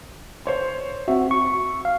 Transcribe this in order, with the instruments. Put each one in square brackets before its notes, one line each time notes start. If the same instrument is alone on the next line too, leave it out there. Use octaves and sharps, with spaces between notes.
[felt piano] C5 C#5 C6
[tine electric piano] C4 F#4 [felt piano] E5
[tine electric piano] C#6
F5